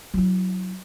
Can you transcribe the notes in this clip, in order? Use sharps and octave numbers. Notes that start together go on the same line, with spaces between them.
F#3 E4